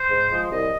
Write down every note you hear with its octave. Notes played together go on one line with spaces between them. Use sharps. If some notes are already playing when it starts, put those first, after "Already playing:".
Already playing: C5
G#2
F3 G#3
C2 D#5